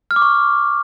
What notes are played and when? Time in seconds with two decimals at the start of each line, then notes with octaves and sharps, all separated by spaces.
0.11 F6
0.16 D6
0.22 C#6